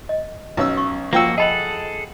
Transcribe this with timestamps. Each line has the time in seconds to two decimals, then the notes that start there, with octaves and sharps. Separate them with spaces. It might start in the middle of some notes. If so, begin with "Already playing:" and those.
0.09 D#5
0.57 B1 C#4 E6
0.77 C#6
1.13 F3 A#3 F#4 G5 E6
1.38 G#4 A4 D#5 F#5 A5 B5